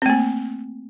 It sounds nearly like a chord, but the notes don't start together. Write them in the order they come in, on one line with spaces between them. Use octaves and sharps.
C4 A3 A#3